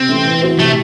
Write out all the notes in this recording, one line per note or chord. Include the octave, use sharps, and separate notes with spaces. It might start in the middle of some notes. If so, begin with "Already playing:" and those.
Already playing: C3 C4
E3 A3 C#4
E3
C4 F#4 C5
C3 A3